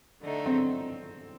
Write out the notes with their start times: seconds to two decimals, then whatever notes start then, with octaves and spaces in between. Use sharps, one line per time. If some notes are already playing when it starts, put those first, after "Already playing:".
0.23 D3 A3 D#4
0.46 C4